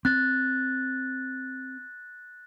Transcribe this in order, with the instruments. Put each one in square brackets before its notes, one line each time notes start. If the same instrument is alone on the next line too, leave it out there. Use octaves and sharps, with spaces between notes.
[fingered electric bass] C4 [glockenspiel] F#6 A6